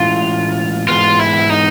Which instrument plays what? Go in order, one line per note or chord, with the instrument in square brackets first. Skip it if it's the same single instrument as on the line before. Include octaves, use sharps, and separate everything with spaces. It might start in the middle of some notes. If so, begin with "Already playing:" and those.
Already playing: [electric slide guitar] A2 E3 G#3 C#4 E4 [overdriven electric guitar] F4
[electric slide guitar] G#2 E3 G#3 B3 [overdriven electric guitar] F4
[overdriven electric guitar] E4
D#4